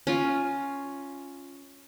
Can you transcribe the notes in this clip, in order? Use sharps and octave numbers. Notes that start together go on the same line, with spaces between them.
C#4 F4 F5